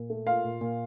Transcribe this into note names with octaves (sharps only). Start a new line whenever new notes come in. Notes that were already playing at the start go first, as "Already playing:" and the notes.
Already playing: A#2
A3
A#3 F4 F5
A#2
A#2